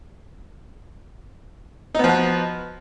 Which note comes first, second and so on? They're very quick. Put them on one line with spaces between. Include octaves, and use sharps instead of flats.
D#4 B3 F3 F#4